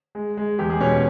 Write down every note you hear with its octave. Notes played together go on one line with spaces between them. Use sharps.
G#3
G#3
E2 G4
G#3 G#4
B2 C#4 C#5